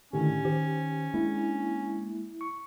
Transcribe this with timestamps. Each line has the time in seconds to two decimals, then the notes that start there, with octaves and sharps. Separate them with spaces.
0.13 A2 D3 D#3 C#4 G4
0.45 D#3 G4 C5
1.14 G#3 A#3 D4 E4
2.41 C#6